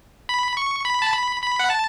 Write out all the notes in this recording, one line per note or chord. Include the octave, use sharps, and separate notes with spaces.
B5
C#6
B5
A5
B5
B5
F#5
A5